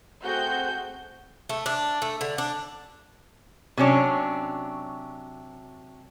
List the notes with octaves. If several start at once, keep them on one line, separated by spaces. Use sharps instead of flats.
A3 C4 F#4 G#4 G6
A3
D4
A3
D3
D4
C3 F#3 C#4 D4